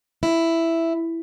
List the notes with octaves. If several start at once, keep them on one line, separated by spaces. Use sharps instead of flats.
E4